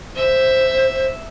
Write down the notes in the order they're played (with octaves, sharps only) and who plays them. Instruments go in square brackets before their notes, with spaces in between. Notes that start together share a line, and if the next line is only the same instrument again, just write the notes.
[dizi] C5 [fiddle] E5